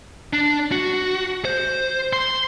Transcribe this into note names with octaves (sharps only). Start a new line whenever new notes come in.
D4
F#4
C5
C6